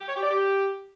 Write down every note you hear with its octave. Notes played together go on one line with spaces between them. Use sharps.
G4
C#5
G4
D5
G4